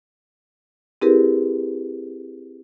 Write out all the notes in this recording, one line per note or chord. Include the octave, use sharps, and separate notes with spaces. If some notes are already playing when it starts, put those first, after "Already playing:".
C4 E4 G4 G#4 A#4 B4